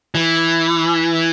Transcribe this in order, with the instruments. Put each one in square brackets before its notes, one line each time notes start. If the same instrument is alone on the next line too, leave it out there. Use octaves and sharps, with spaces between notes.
[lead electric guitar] E3